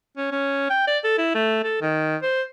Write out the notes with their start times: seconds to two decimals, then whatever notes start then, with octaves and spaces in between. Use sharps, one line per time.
0.17 C#4
0.32 C#4
0.70 G5
0.87 D5
1.04 A4
1.18 E4
1.35 A3
1.64 A4
1.82 D#3
2.22 C5